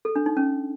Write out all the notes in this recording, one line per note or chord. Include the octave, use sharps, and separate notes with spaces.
A4
D4
D#4
C#4